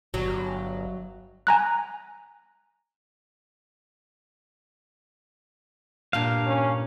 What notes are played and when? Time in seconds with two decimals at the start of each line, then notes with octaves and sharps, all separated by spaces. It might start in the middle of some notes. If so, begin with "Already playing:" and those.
0.14 G1 F#3
1.47 G#5 A#5 F#6
6.13 G2 A#2 F5 A5
6.46 C#4